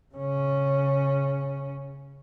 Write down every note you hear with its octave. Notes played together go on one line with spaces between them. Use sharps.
C#3 C#4